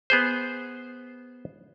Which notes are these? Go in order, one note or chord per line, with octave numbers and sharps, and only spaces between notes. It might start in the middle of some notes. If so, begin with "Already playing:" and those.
B3 G#4 C5